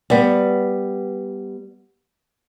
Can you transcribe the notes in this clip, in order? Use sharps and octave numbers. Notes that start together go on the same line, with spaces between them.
G3 B3